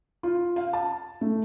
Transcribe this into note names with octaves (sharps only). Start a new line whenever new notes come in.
F4
F5
A5
A3